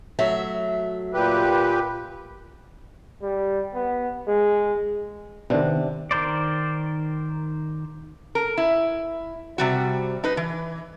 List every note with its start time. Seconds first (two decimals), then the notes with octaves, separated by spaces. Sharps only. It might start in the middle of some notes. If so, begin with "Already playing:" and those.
0.19 F#3 A3 E5
1.14 A#2 G4 B4
3.22 G3
3.74 B3
4.28 G#3
5.50 C3 D#3 B3 D4
6.11 D#3 A#4 C5 D5
8.35 A#4
8.57 E4
9.58 C3 G3 F#4
10.24 D#4 B4
10.37 E3